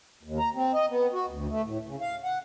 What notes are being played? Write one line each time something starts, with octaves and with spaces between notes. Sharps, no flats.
D#2
A#5
C4
D#5
B3
F#4
D2
A3
A2
C#3
F5
F#5